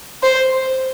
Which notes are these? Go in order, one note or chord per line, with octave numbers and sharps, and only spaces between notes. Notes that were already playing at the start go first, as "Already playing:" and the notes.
C5